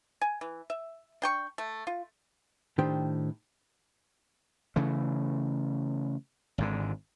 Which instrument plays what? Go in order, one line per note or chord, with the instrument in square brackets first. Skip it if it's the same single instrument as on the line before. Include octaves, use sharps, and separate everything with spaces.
[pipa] G#5
E3
E5
D4 G5 C#6
A3
F4
[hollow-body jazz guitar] A2 D#3 D4 G4 C5 G5
[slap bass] C#3 E3 A3
G#1 G#2 D3